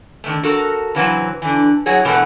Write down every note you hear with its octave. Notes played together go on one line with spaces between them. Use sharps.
D3 D#3 A3
F#4 A4 A#4
C#3 E3 F#3 C4
D3 E3
F#3 E4 F#4 G#4 C#5
B2 E3 A3 A4 F#5